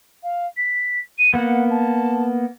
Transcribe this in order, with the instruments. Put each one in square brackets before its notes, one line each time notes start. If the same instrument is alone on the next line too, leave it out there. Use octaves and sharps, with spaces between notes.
[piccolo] F5
B6
D#7
[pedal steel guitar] A#3 B3 [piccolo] F#5
[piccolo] A5